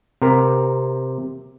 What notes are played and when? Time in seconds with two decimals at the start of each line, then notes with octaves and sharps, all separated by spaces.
0.22 C3 A#4